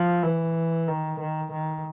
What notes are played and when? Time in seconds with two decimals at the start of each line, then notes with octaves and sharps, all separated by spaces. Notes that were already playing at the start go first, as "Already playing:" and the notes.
Already playing: F3
0.23 E3
0.88 D#3
1.19 D#3
1.52 D#3